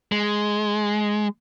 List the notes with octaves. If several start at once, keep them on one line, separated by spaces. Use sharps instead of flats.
G#3